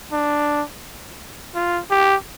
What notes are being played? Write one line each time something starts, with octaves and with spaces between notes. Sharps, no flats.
D4
F4
G4